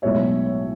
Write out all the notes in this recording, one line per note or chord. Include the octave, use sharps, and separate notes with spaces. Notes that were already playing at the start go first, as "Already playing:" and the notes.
B1 A2 G#3 B3 C#5 E5